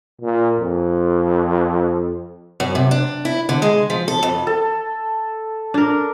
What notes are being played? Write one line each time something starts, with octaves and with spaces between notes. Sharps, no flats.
A#2
F2
F#2
C3
D4
E4
D3
G#3
F3
A4
F2
A4
D4 A#4